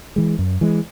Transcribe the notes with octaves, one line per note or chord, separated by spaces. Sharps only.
E3 G#3
F#2
E3 G#3